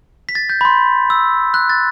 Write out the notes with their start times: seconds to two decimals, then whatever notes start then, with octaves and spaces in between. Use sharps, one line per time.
0.29 B6
0.35 A6
0.49 G6
0.61 B5
0.65 C6
1.10 E6
1.54 F#6
1.69 A6